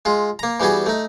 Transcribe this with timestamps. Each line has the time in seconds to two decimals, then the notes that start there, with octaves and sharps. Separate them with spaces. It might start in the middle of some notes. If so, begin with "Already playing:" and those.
0.05 G#3 F4
0.39 A#3 A#5
0.60 E3 G3 B3 F#4 G#4
0.86 A3 D#4